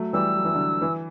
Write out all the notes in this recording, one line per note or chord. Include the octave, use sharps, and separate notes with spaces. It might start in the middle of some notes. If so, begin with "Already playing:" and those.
Already playing: F#3 A3
E3 G3 E6
F#3
E3
D3 F#3
E3